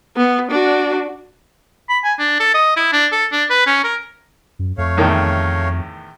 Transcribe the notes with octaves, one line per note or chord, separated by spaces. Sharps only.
B3
D4 F#4
B5
G#5
D4
A4
D#5
E4
D4
A4
D4
B4
C#4
A#4
F#2
F2 A3 C#5 F5
E2 A2 D#3